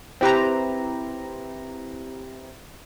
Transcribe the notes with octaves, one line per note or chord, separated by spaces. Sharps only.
C4 E4 G4 B4 C5 A#5